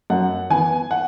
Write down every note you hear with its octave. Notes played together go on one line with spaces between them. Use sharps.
F#2 F#5
E3 B3 G#5
F#5